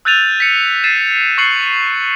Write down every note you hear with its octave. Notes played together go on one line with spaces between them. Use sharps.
E6 F#6 G6 A6 D#7 F7
B6 C#7
A6 C7 D#7 E7
C#6 F#6 A6 C7 C#7 F#7